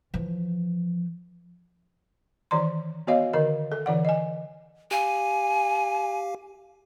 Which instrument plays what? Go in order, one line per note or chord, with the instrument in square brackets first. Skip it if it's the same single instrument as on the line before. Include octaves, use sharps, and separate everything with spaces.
[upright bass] E3 F3
[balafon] D#3 E3 D5 A#5 C6
B3 F#4 C#5 D#5 F5
D3 D#3 A#4 D#5
A4
D3 E3 D5 F#5
D#5 G#5
[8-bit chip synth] G4 F5 [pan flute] G#5